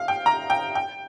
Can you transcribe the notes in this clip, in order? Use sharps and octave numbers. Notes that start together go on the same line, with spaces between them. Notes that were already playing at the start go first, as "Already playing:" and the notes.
Already playing: F5
G5
A#5
G5
G5